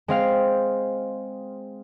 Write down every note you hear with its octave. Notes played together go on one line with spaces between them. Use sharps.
G#3 C4 F5